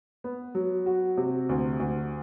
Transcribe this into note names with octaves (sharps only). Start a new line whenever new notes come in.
B3
F#3
F#4
C3
D2
D2